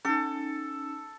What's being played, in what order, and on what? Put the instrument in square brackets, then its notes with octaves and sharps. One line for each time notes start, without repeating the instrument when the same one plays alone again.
[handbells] C#4 D#4 [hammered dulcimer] A4